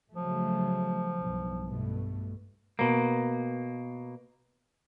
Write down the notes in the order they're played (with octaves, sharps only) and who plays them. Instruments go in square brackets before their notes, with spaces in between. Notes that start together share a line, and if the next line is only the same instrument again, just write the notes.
[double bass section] C#3 F#3 A3 [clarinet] F3
[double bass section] B1 G2
G2 B2 A3
[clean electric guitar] B2 A#3